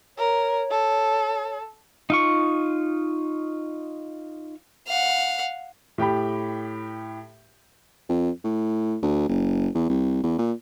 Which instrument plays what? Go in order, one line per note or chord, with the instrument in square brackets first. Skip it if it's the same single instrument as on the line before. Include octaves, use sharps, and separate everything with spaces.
[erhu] A#4 [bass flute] C#5
[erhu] A4
[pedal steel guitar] D#4 F4 C#6
[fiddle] F5 F#5
[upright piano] A2 G4 G5 B5
[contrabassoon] F2
A2
D2
F#1
E2
C2
E2
A#2